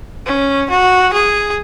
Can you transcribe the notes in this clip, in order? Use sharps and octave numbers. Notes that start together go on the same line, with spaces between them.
C#4
F#4
G#4